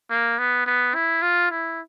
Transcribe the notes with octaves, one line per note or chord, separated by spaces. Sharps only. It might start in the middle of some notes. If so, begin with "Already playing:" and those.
A#3
B3
B3
E4
F4
E4